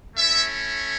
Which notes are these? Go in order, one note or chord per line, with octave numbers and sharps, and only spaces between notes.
A3 C#4 E4 E5